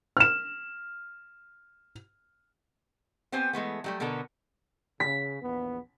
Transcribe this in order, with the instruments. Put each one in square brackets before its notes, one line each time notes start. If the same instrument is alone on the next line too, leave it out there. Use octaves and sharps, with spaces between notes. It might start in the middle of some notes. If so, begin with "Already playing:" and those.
[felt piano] F6 E7
[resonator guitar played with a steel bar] B3 C4 G4 C5 G#5
E3 G#3 A3 B3
F#3 G3 A3
B2 D3 B3 A4 A#4 A#5
[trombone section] C#3 [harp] B6
[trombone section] A#1 E2 B3